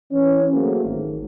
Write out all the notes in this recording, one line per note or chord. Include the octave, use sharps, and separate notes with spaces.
E3 C#4
F#3 A3 A#3 C4 F#4 G#4
G#1